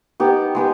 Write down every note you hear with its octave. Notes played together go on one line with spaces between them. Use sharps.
B3 D#4 G4
G#3 B3 G4 B4